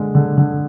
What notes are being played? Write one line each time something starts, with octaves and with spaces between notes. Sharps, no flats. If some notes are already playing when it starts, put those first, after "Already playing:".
Already playing: D3 G#3
D3
D3